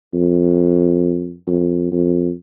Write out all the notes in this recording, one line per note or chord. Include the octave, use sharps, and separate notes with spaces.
F2
F2
F2